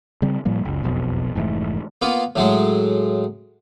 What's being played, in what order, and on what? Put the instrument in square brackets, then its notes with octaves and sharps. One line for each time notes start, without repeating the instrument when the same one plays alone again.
[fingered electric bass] C#3 G3 C4
A2 F3 G3 A#3
F#1 C#2
E1 B1 F2 B2
F1 G#2 E3 A3
[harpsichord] A#3 B3 F4
A2 F#3 G#3